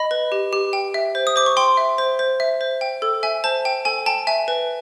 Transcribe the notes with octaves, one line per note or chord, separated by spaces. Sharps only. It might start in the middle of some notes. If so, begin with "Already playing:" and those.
Already playing: D#5 B5
B4
G4
G4
G5
E5
C5
D#6
C5 D6
C#6
G5 C6
E5
C5
C5
E5
C5
G5
A4
E5 G#5
C5 A5
G5
A4 G#5
G5 A5
E5 G#5
B4